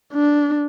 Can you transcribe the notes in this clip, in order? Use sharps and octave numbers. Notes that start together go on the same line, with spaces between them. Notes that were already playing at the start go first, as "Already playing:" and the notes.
D4